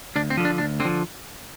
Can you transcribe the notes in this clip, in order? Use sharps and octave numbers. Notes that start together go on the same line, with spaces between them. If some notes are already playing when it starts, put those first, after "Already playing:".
D2 D4
C4
D3 F3
D4
D2 D4
D3 C4
F3